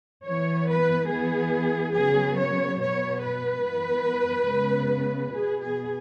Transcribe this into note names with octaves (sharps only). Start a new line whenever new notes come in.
E3 B3 C#5
B4
E3 B3 G#4
C#3 F#3 B3 G#4
C#5
B2 B3 C#5
B4
E3 B3
C#3 G#3 B3
B2 B3 G#4
G#4